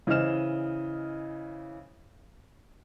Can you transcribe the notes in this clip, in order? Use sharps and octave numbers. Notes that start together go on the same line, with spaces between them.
C#3 E3 C5 D#5 F6 E7